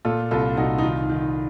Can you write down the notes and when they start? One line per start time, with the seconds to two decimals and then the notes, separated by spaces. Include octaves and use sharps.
0.05 A#2 F4 A4
0.31 C2 F4 A4
0.57 C2 D#4 F#4
0.78 D#4
0.83 D#3 F4
1.10 D#3